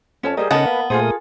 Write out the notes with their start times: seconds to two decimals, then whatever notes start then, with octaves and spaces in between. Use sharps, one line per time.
0.23 F2 C#4 C#5 A5
0.37 G3 G#4 A#4 C5 D#5
0.51 C#3 B3 C#4 D#4 A#4 D#5 F#5 A5
0.66 A#3 B4
0.90 A#2 A3 F4 G#4 A4 C5 D#6
1.02 A#4